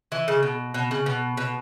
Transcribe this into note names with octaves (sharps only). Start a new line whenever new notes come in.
E3
C#3
B2
B2
C#3
B2
B2